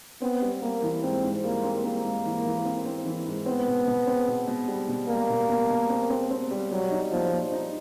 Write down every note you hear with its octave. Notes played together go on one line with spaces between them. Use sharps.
B3 C4
G3
G3 A#3
E3
G#2 C4
G#2
G3 A#3
C4
G#2 A#3
G#2
E3
E3
C4
C4
E3
G#2
B3 C4
B2
B2
C4
B2
B2
G3
B2
G3 A#3
B2
B2
B2
C4
C4
C4
G3
F#3 G3
D#4
A#2 F3
A#2
D#4